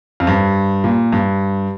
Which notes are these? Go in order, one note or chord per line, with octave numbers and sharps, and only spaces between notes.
F2
G2
A#2
G2